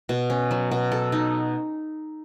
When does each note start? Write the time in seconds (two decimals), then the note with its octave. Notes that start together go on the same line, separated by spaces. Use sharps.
0.09 B2
0.30 C#4
0.51 F#3
0.71 B2
0.92 A4
1.12 D#4